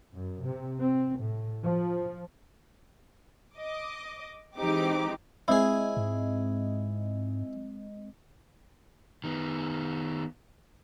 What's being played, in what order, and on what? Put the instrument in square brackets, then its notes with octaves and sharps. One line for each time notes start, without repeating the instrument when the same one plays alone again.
[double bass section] F#2
C3
C4
A2
F3
[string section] D#5 D6
E3 G#3 C4 D#4 G4 D6
[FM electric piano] G#3 C4 D#5 [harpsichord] E4 G#4
[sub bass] G#2
[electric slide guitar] D#3 B3